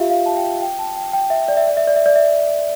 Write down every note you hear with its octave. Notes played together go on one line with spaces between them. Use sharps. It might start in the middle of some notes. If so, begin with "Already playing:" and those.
Already playing: F4 G4 E5 F5
F5
A5
G5
G5
A5
G5
G5
E5
D5
E5
D5
E5
D5
E5
D5
E5